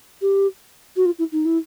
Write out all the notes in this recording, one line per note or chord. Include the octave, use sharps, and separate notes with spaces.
G4
F#4
F4
E4
D#4
E4